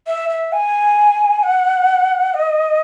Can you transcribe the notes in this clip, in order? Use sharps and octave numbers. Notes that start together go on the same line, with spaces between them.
E5
E5
G#5
F#5
D#5